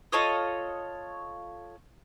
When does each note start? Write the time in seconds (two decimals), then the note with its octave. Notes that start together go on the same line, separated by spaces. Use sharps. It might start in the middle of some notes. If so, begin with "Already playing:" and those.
0.12 F4 A4 C#5 D#5